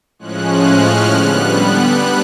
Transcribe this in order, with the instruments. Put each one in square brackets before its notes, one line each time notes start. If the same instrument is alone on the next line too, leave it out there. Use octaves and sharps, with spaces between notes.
[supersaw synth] A2 F3 G#3 C#4 F#6
F6
D3 G3 B3 F#6
F#6